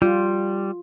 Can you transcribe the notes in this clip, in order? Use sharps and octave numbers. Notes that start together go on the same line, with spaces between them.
G3 F4